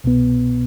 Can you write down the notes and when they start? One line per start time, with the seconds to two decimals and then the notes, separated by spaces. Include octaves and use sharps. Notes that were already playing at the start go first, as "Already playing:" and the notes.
0.04 C2 B2 B3